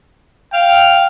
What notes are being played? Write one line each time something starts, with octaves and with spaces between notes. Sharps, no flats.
F5 G5